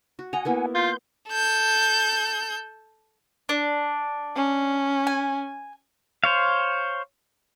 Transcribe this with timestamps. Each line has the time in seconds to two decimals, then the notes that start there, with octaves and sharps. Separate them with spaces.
0.19 F#4
0.33 D#5 F#5 G#5 A#5
0.45 A#3 B3 E4
0.75 F4 C6 G6
1.28 A4 G6
3.49 D4
4.36 C#4
5.07 G#5
6.24 C5 C#5 F5